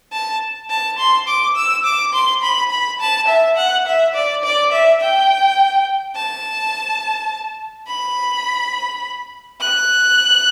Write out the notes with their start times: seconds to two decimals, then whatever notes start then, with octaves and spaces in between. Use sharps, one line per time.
0.12 A5
0.70 A5
0.98 C6
1.28 D6
1.56 E6
1.84 D6
2.13 C6
2.43 B5
2.71 B5
3.00 A5
3.28 E5
3.56 F#5
3.86 E5
4.14 D5
4.44 D5
4.72 E5
5.01 G5
6.15 A5
7.87 B5
9.60 F#6